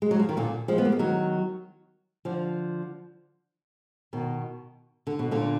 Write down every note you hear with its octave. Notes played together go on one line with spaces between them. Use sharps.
G#3
F#3
F3
D#3
A#2 D3
F3 G#3
B3
A#3
G#3
D#3 F#3
D3 F3
B2 D#3
D3
B2
A#2 D3